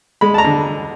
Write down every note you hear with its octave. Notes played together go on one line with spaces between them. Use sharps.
G#3 B5
A5
A#5
D3